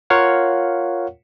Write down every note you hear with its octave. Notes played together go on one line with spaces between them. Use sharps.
F4 A#4 C#5 F5 F#5